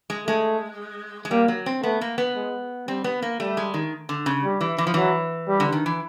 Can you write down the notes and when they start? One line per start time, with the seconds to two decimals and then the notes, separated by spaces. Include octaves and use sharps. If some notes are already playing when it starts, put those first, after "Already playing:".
0.10 G#3
0.27 G#3 A3
1.25 G#3
1.31 G3 A#3
1.48 F#3
1.66 C4
1.83 A3 B3
2.01 A#3
2.18 B3
2.36 G#3
2.88 G3 C4
3.04 B3
3.22 A#3
3.40 G3 A3
3.57 G#3
3.74 D#3
4.09 D3
4.26 C#3
4.44 G3
4.61 E3
4.78 E3
4.87 F3
4.94 E3 F#3
5.48 G3
5.60 D3
5.72 D#3
5.86 E3